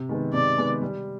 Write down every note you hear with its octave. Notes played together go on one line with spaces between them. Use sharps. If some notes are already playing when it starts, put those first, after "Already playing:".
Already playing: C3
D#3 G#3 B3
C3 D5
D#3 G#3 B3
G3